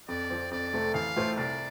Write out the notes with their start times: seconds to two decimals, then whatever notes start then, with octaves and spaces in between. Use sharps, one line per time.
0.08 F2 D5
0.30 F3 C4
0.51 F2 D5
0.73 C3 A3 C4
0.94 A1 F5
1.16 A2 A3 F4 C5
1.37 C2 D5